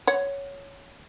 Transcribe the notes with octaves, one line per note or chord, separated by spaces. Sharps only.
C#5 F#5